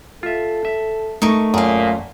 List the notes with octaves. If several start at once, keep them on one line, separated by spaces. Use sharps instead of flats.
F4 A4 E5
E5
A3 D#4 A#4 C#6
F#2 A#2 G#4 F5